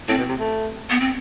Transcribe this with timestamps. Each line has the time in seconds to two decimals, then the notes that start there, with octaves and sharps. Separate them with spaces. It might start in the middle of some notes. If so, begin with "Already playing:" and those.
0.08 A2 C4
0.18 B2
0.29 C3
0.39 A3
0.90 B3
1.00 C4